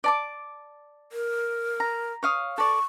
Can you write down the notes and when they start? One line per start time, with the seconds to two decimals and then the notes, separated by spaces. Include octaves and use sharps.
0.04 D5 A5 D6
1.12 A#4
1.80 A#5
2.23 C#5 F5 D#6
2.58 A4 D5 C#6